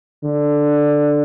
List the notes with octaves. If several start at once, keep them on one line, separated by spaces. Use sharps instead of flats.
D3